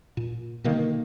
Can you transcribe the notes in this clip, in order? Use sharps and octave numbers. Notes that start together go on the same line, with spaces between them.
A#2
B2 D3 D#3 A#3